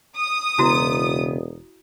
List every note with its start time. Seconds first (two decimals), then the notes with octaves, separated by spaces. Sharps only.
0.18 D#6
0.58 E1 C#3 B3 E4 F#4 A#5